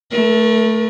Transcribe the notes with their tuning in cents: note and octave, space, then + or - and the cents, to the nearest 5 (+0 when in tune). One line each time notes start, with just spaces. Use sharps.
A3 +0 A#4 +40